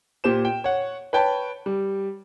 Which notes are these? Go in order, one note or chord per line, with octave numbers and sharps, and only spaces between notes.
A#2 G4 C5 E7
G5
C#5 F#5
B4 C#5 G5 A5 B5
G3